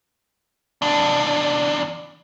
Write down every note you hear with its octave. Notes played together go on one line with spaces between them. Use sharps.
E2 D4